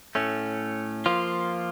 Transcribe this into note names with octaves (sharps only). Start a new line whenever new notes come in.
A2 A3 C#4
F3 A#3 F4